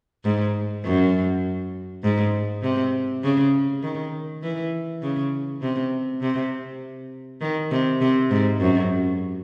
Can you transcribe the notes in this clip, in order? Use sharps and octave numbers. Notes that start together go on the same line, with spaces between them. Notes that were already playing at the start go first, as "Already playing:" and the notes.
G#2
F#2
G#2
C3
C#3
D#3
E3
C#3
C3
C3
D#3
C3
C3
G#2
F#2